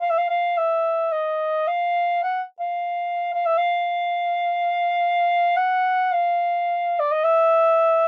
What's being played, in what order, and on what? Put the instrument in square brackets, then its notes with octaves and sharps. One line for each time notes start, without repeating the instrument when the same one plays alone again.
[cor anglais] F5
E5
F5
F5
E5
D#5
F5
F#5
F5
F5
E5
F5
F#5
F5
D5
D#5
E5